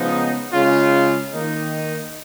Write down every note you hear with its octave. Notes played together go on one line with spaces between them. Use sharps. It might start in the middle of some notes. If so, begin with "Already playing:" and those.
Already playing: C#3 F3 G#3 B3 D#4
C#3 G#3 C#4 F4
D#3 A#3 D#4